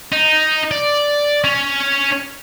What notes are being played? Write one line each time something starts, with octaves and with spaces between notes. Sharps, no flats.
D#4
D5
C#4